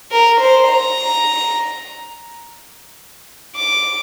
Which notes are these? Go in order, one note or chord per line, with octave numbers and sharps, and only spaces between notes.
A#4
C5
A#5
D6